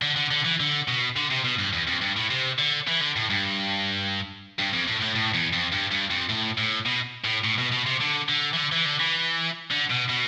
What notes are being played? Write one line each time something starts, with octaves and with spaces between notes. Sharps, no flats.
D3
D3
D3
E3
D3
B2
D3
C3
B2
G2
E2
F2
G2
A2
C3
D3
E3
D3
A2
G2
G2
F2
A2
A2
A2
E2
F2
G2
G2
F2
A2
A2
B2
A2
A2
B2
B2
C3
D3
D3
E3
D3
E3
D3
E3
D3
B2
B2